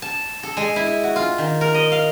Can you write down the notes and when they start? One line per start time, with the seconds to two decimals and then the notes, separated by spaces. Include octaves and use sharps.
0.02 A5
0.43 A4
0.57 G#3
0.76 E4
1.03 F#4
1.16 F4
1.38 D#3
1.61 A#4
1.74 D#5
1.92 F5